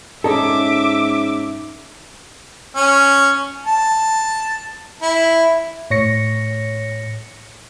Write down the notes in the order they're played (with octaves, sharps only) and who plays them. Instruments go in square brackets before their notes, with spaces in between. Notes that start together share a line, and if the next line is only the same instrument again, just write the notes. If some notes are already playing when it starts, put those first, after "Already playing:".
[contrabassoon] G#2 [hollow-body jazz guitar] C#4 D#4 A4 [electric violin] E5 D6
[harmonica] C#4
A5
E4
[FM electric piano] A2 C#5 A#6 C#7